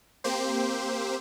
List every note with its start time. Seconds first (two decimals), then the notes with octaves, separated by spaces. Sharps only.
0.24 A#3 C4 G4 C5